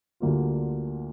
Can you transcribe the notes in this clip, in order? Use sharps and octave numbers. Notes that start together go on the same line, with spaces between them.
D2 D3 G3 A#3 F4